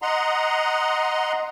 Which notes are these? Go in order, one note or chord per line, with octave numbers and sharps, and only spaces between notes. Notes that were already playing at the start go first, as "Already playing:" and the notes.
D#5 F#5 A#5 C6